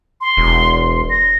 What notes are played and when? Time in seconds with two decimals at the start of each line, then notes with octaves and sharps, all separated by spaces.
0.21 C6
0.37 E1
1.10 A#6